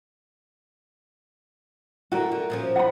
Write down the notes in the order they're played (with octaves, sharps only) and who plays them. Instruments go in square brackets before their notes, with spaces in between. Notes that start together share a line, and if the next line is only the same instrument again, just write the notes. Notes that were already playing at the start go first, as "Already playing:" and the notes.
[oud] D3 A3 [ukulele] F#4 A#4
[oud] D3
A#2 F3 C#4
[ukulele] F#5 B5